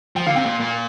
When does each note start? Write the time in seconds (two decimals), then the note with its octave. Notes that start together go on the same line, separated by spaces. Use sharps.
0.16 F3 G5
0.26 D3 F5
0.36 C3 G5
0.46 A#2
0.60 A#2